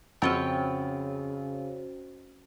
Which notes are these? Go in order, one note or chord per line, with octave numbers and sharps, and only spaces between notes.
F2 C#3 C#4 F#4 C5 C#5 G5 E6